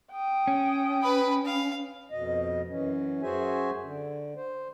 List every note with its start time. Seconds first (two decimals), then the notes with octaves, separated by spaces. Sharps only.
0.12 G5 D#6
0.47 C#4
1.02 B4 B5
1.45 F5
2.11 F2 B2 D#5
2.68 F#2 E3 C#4
3.22 F#2 F#4 G#4 C5 E5 G#5
3.82 D3
4.36 C5